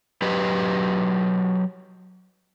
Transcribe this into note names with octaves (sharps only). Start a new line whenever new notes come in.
F#3 G4 B4 D#5